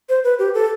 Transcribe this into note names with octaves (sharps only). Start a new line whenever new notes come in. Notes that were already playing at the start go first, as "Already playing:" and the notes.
C5
B4
G4
A4